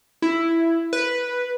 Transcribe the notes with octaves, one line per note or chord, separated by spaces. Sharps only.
E4
B4